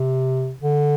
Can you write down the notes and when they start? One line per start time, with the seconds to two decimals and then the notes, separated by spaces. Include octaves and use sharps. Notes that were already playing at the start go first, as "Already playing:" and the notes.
Already playing: C3
0.62 D3